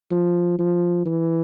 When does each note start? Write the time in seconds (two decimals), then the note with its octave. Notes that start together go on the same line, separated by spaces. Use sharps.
0.11 F3
0.58 F3
1.05 E3